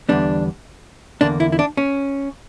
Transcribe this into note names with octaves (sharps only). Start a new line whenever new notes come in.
E2 D3 G3 B3 D4
E2 D3 A#3 D4
E4
E4
D4
C#4